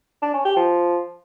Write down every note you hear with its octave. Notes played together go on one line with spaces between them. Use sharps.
D4
C#4
G4
F3